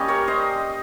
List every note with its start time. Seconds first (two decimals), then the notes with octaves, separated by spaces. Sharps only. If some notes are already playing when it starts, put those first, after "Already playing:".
Already playing: G3 A#3 C#4 D#5
0.08 A#4 C#5
0.27 C5 D#5